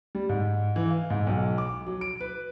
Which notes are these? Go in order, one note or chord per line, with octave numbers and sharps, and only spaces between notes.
G3
G#2
E3
F5
G#2
B1
D6
F#3
D7
B4